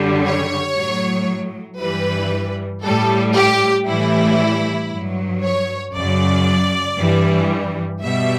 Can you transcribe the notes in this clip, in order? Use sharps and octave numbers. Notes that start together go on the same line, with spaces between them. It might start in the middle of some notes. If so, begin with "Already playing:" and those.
Already playing: F#2 D3 G3
C#5
A2 F#3
G2 E3 G3 B4
A2 G3 A4
G4
A2 E3 G3 E4
G2 F#3
C#5
F#2 C#3 F#3 D5
G2 E3 G3
B2 G3 E5